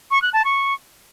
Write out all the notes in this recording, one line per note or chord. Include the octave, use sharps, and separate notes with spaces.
C#6
F#6
A5
C#6